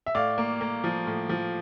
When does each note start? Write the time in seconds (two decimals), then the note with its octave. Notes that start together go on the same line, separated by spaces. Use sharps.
0.06 E5
0.15 A2 D5 F5
0.38 A#3
0.61 A#3
0.84 F3
1.07 A2
1.29 F3